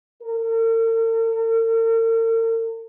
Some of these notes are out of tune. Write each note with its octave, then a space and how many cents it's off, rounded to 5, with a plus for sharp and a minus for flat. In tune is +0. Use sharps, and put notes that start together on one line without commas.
A#4 -45